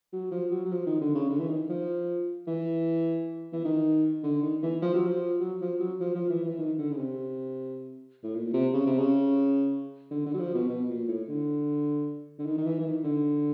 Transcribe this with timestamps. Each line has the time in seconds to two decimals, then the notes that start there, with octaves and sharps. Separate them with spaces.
0.13 F#3
0.31 F3
0.51 F#3
0.65 F#3
0.72 F3
0.86 D#3
1.01 D3
1.15 C#3
1.30 D3
1.40 E3
1.49 D#3
1.70 F3
2.47 E3
3.53 E3
3.65 D#3
4.24 D3
4.42 D#3
4.63 E3
4.82 F3
4.94 F#3
5.06 F3
5.40 F#3
5.61 F3
5.80 F#3
6.00 F3
6.15 F3
6.30 E3
6.44 E3
6.59 D#3
6.78 D3
6.91 C#3
6.97 C3
8.23 A2
8.35 A#2
8.54 C3
8.74 C#3
8.86 C3
8.98 C#3
10.11 D3
10.26 D3
10.34 F#3
10.40 F3
10.55 B2
10.69 B2
10.89 A#2
11.08 A2
11.29 D3
12.39 D3
12.46 D#3
12.58 D#3
12.66 E3
12.80 E3
12.85 D#3
13.04 D3